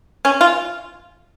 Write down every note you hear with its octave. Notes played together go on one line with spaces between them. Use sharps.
C#4
F4